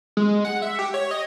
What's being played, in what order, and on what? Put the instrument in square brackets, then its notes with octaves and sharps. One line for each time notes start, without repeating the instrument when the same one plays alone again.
[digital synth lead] G#3
F#5
E5
G4
C#5
D#5